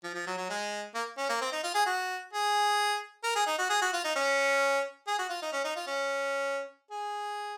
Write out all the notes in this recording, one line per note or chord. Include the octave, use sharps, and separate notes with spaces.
F3
F3
F#3
F#3
G#3
A#3
C#4
A#3
C4
D#4
F4
G#4
F#4
G#4
A#4
G#4
D#4
F#4
G#4
F#4
F4
D#4
C#4
G#4
F#4
F4
D#4
C#4
D#4
F4
C#4
G#4